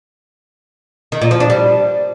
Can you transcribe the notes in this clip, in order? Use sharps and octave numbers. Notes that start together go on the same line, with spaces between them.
D#3
A#2
F3
D4
G3